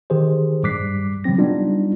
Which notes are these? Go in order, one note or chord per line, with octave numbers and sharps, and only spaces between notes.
D#3 G4 G#4 C5
G2 G3 D6 F#6 B6 C7
C#3 F3 F#3 C4 A#6
G3 B3 D4 D#4 F4